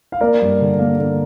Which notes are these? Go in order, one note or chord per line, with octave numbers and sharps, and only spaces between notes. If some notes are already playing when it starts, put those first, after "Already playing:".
F5
A#3 A#4 D5
G2
D3
A#3
D3